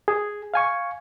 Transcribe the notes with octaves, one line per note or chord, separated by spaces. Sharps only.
G#4
F5 G#5 C#6